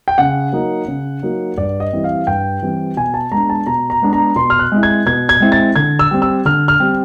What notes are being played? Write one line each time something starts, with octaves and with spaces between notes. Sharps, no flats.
G5
C#3 F#5
F#3 A#3 D#4
C#3
F#3 A#3 D#4
G2 D5
D#5
E3 G3 C4 E4
F5
G2 G5
E3 G3 C4 E4
B2 G#5
A5
G#3 B3 D4 A#5
A5
B2 A#5
A#5
G#3 B3 D4
A#5
B2 C6
F6
F#6
G#3 C4 E4
G#6
B2 G#6
G#6
G#3 C4 E4
A6
D3 G#6
E6
G3 C4
E6
D3 F6
F6
G3 C4